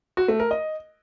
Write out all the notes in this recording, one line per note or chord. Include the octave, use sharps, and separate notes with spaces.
F#4
A3
A#4
D#5